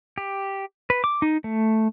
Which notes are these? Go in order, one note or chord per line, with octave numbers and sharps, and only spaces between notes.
G4
B4
D6
D#4
A3